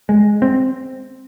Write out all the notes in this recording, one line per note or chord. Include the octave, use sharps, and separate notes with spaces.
G#3
C4